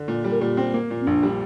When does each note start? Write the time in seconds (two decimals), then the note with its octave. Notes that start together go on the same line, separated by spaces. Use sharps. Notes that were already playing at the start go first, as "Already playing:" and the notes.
Already playing: D3
0.08 A#2
0.24 G3
0.31 A#4
0.40 A#2 G4
0.57 C4
0.74 A#3
0.91 A#2
1.01 C4
1.06 A#1 D4
1.23 G3